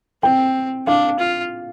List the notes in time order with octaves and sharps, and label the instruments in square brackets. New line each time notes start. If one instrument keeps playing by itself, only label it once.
[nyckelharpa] C4 [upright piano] G5
[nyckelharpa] D4 [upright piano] F5
[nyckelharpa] F4